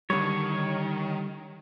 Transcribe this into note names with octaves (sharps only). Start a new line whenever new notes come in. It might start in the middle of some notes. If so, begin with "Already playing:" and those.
D3 D#3 G3 C#5